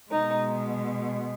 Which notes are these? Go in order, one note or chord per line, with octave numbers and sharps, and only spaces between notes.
B2 G#3 D#4